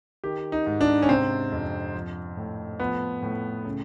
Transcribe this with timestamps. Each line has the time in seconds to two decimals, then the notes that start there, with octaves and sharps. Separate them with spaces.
0.24 D#3 G4
0.52 D#4
0.67 G#2
0.81 D4
1.02 C#4
1.09 C3 C4
1.52 F2
1.94 F3
2.37 A2
2.80 F3 B3
3.23 A2
3.65 C#3